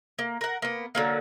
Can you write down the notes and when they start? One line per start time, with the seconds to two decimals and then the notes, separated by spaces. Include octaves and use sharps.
0.19 A#3
0.41 A#4 F#5
0.62 A#3 B3
0.95 D3 F#3 A#3